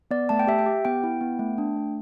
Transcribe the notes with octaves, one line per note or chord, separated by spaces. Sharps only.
B3 D5
A3 A5
G5
G4 E5
G5
G4
B3 G5
E4
B3
A3
D4
A3